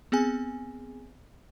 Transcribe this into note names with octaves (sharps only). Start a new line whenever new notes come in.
B3 C4 G#4 G#5